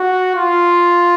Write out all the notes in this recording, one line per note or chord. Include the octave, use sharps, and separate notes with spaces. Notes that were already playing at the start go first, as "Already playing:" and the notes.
Already playing: F#4
F4